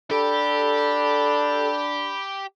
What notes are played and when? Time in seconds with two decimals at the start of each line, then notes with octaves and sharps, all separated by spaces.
0.11 D4 G4 A4 B5